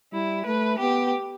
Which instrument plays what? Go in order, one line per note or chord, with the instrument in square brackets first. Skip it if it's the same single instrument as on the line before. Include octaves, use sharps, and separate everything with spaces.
[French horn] G3 [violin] E4
[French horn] A3 [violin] B4
[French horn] B3 [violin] G4